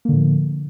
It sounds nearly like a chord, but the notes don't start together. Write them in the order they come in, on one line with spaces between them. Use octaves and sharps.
A#3 D3 A2 F3